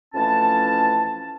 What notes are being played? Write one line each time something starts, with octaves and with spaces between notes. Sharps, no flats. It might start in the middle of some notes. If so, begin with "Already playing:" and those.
F2 E3 A3 C#4 A5